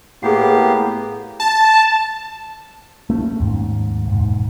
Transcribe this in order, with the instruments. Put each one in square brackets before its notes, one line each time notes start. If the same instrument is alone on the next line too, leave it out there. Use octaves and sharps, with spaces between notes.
[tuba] A2 [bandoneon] A#3 B3 G4 [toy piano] G#4 F#5
[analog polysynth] A5
[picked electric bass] A3 C#4
D#2 G#2
E1 G#2